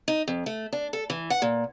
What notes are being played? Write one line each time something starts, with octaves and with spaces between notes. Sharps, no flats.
D#4
F2
A3
D4
A4
E3
F#5
A#2